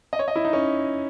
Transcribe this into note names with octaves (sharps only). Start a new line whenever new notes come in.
D#5
C#5
D#5
E4
D#4
C#4